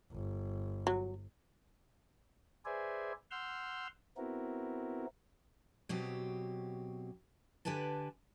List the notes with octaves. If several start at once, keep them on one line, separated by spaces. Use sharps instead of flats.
G1
F#3
G#4 B4 C5 D5 E5 G#5
F#5 C6 E6 F6 G6
B3 C4 E4 F#4 A#4
B2 F#3 C4 G4
D3 G4 B4 G#5 A5